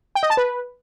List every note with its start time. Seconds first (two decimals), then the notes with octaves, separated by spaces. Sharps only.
0.15 G5
0.23 D#5
0.30 A5
0.37 B4